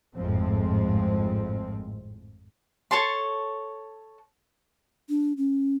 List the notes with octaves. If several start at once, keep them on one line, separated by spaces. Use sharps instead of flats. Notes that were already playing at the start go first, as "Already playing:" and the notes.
G#1 F2 A2 F3 G#3 C4
A4 C#5 A5 C6
D4
C#4